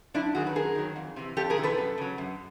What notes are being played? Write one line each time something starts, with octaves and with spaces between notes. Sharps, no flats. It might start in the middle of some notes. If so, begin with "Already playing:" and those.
F#2 D4 E4
D#3 F#3 F#4 G#4
B4
F#2 G#4 A#4
D#3 F#3
F2
C3 E3
F2 G4 A4
G#4 A#4
C3 E3
A4 B4
F#2
C#3 F#3
F#2